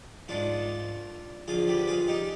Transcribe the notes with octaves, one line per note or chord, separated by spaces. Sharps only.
G#2 D#3 D4 F4
F2 D3 F4 G#4
G4 B4
B4
F4 G#4
D#4 G4